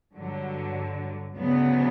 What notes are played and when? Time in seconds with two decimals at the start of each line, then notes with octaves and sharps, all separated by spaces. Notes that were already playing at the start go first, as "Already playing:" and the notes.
0.15 G2 D3 F#3
1.36 D2 C#3 F#3 B3